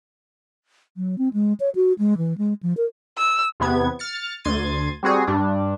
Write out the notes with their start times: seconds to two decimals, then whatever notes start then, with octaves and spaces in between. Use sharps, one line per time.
0.97 F#3
1.18 C4
1.34 G#3
1.60 C#5
1.75 F#4
1.99 G#3
2.18 E3
2.38 G#3
2.63 F3
2.77 A#4
3.18 E6
3.60 E2 C3 B3 G#6
3.99 F6 A6 C#7
4.44 D2 C6 G#6 A6 D#7
5.03 G3 C4 F#4 G#4
5.27 G2 D4